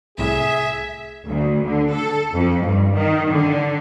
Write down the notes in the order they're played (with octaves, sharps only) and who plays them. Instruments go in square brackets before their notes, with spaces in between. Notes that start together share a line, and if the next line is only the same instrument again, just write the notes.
[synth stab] C2 A2 [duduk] G#4 [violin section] E5
[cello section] D2
D3
A4
F2
G2
D#3
D3